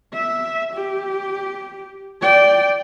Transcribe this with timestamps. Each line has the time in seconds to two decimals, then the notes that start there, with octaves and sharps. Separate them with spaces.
0.13 E5
0.74 G4
2.22 D5 G5